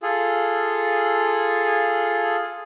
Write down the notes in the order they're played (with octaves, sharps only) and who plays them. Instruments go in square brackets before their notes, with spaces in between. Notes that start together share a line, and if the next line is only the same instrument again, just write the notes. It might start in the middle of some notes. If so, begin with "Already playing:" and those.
[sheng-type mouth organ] F4 G#4 A4